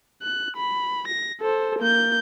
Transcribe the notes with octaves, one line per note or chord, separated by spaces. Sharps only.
F#6
B5
A#6
A4 C5
A#3 G6